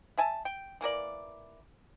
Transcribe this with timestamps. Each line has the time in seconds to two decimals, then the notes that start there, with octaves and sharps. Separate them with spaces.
0.17 E5 G#5 A5
0.45 G5
0.81 E3 A#3 A#4 D5